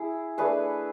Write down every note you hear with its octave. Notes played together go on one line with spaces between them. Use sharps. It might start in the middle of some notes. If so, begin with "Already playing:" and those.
Already playing: E4 G#4
A3 D4 G#4 B4